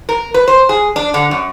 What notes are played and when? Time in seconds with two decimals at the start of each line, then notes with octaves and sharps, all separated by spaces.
0.09 A#4
0.34 B4
0.48 C5
0.69 G#4
0.96 D4
1.14 D3
1.31 F#2